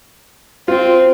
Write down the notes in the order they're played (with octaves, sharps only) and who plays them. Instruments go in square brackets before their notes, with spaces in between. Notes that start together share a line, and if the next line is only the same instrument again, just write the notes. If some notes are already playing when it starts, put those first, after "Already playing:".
[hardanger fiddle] C4 [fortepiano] F4